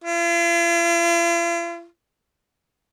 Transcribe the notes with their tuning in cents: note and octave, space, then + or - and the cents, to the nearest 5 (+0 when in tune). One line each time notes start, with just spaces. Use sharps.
F4 -45